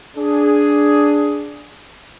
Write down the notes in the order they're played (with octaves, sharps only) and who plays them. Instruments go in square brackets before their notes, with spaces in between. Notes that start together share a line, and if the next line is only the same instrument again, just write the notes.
[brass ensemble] D4 G#4